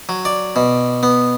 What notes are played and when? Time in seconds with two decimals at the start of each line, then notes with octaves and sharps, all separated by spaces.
0.09 F#3
0.25 D5
0.56 B2
1.03 B3